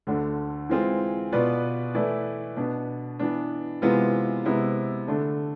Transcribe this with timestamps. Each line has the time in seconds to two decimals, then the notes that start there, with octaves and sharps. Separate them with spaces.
0.07 D2 D3 A3 D4
0.69 E3 G#3 C4 F4 G#4
1.32 B2 B3 F4 B4 D5
1.94 E3 A3 E4 B4 D5
2.57 B2 B3 D4
3.19 E3 B3 D4
3.82 C3 E3 G#3 B3 F4
4.45 C3 G#3 B3 E4
5.08 D3 A3 D4 A4